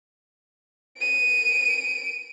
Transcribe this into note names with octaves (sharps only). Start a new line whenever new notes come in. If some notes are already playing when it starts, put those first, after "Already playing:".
D7 D#7